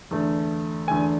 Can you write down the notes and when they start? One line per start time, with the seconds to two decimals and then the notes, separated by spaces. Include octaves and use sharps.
0.11 E2 D3 A3
0.87 E2 D3 A3 G#5